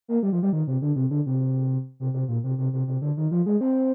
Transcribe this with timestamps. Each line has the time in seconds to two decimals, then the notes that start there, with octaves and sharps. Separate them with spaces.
0.08 A#3
0.23 G3
0.33 F3
0.43 G3
0.53 D#3
0.67 C3
0.82 D3
0.96 C3
1.11 D3
1.26 C3
2.00 C3
2.14 C3
2.28 A#2
2.44 C3
2.58 C3
2.73 C3
2.87 C3
3.02 D3
3.17 D#3
3.31 F3
3.46 G#3
3.61 C4